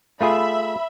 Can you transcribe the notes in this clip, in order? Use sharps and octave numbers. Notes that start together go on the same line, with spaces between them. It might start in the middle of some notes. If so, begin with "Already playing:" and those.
A3 F4 G#4 E5 B5